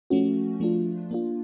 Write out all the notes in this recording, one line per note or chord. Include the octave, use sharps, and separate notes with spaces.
F3 A3 C#4 F#4
F3 A3 D4 F4
A#3 D4 F4